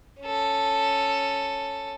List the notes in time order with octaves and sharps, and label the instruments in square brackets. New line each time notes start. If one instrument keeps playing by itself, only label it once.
[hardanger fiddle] C#4 A4